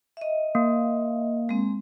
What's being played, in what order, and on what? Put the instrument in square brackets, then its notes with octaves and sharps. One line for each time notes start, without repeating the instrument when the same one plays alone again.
[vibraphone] D#5 E5
[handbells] A#3
[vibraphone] G#3 C4